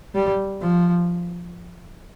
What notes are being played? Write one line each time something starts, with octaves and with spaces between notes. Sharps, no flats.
G3
F3